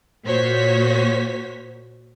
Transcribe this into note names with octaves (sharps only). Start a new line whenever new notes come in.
A#2 A#3 F#4 C5 C#5 B6